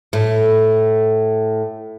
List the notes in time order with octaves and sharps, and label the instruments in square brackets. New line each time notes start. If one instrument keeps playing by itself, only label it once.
[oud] A2